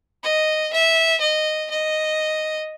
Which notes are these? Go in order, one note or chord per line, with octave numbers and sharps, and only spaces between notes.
D#5
E5
D#5
D#5